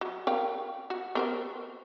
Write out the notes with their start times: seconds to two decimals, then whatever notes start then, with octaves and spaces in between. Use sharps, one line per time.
0.01 F#3
0.27 A#4 F5 G5
0.90 F#4
1.15 B3 A#4 C5